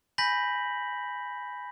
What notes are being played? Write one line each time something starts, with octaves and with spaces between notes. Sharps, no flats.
G#5 B5 G6 A#6 B6 F#7